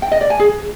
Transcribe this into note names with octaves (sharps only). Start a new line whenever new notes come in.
G5
D#5
D5
G#5
G#4